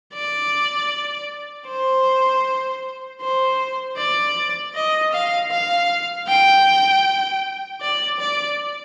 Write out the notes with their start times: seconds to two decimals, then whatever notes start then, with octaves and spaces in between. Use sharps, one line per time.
0.14 D5
1.67 C5
3.21 C5
3.97 D5
4.75 D#5
5.12 F5
5.51 F5
6.28 G5
7.81 D5
8.20 D5